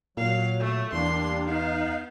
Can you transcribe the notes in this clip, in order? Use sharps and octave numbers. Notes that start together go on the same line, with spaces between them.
A#2 F#3 F5
A3
E2 G3 A#3 D4 C6
B3 D#4 F5